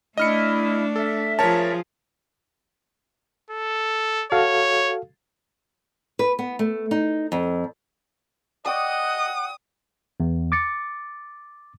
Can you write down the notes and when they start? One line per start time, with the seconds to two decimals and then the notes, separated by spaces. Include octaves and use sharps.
0.17 A3 D4 E4 D#5 F6 C#7
0.96 A4 E5
1.39 F3 G#4 A#4 C#5 A5
3.51 A4
4.32 F#4 A4 C#5 F5
6.19 B4
6.39 B3
6.59 A3
6.91 D#4
7.32 F2
8.66 D5 D#5 F#5 G5 C#6 D#6
10.20 E2
10.52 D6 A6 C#7